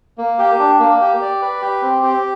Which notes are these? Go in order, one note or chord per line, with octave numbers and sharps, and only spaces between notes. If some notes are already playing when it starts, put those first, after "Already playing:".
A#3
G4
D4
A#3
G4
D5
B4
G4
C4
G4